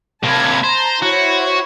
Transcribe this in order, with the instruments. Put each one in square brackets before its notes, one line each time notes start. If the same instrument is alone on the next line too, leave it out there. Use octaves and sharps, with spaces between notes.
[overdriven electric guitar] C3 A#3 [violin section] A5 B5 G#6
[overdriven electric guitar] C5 [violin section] A5 A#5
[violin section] E4 C5 C#5 [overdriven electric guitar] F#4